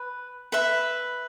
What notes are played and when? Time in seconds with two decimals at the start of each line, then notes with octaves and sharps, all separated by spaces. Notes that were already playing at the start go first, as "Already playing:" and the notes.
Already playing: B4
0.52 B4 E5 B5